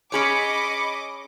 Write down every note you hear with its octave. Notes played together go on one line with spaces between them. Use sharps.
C#4 G#4 C#5 D#5 B5 D6 C#7